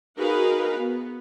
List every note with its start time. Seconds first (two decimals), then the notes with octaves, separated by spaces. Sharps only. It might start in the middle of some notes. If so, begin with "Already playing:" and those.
0.16 D#4 F#4 G#4 A#4 B4 F5
0.79 B3